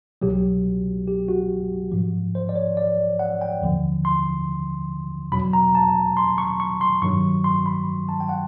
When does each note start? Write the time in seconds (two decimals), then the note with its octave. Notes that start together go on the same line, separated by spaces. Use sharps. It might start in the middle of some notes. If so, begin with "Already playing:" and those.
0.22 C2 B2 F#3 G4
1.08 G4
1.29 F#4
1.92 G#2 F3
2.35 C5
2.49 D5
2.56 C#5
2.77 D5
3.19 F#5
3.41 G5
3.61 D#2 D3 F3
4.05 C6
5.32 E2 B2 F#3 B5
5.53 A#5
5.75 A5
6.17 C6
6.38 C#6
6.60 C#6
6.81 C6
7.02 G2 D#3 F#3 C#6
7.44 C6
7.66 B5
8.09 A5
8.20 G5
8.29 F#5